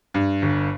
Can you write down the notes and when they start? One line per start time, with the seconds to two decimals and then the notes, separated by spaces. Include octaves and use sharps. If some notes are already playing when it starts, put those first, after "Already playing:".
0.14 G2
0.42 G1